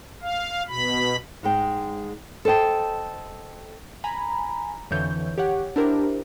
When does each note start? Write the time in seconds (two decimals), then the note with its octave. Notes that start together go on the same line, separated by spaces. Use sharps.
0.22 F5
0.68 B2 B5
1.43 G#2 G#3 G5
2.45 A4 C5 D#5 G5 A5
4.04 G#5 A#5 B5
4.91 F2 D3 E3 C#5 G6
5.38 G4 C#5 F#5
5.76 D4 E4 G4 A#4 C5